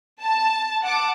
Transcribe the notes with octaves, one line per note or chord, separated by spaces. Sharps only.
A5
F#5 A5 D6